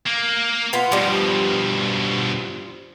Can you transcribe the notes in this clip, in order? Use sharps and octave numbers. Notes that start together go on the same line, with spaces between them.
A#3
B3 F4
G2 B2 F3 G3